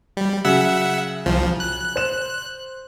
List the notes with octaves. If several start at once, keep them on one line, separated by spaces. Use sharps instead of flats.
G3
C#3 F#3 E5 F#5 E6
C2 F3
F#6
C5 E7